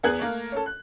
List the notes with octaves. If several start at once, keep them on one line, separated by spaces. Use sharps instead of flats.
E2 B3 G#4 F#6 G#6 F#7
A3 A#3 A#4
C#4 A4
F#6